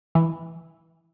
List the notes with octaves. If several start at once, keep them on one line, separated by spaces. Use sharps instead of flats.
E3